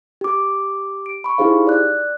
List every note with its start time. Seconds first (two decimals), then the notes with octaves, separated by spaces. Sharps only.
0.21 G4 D6
1.06 D7
1.24 B5 C#6
1.38 D#4 E4 G4 G#4 C5 F5
1.67 D5 F#6